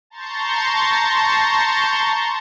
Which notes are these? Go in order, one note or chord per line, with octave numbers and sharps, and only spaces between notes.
A5 A#5 C6 C#6 G6 A6